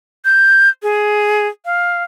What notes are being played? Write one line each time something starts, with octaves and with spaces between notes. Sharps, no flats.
G6
G#4
F5